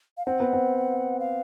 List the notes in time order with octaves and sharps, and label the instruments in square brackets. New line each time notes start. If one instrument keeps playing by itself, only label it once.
[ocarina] F5
[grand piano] C4 [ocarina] F#5
[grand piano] B3
C4
[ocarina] F5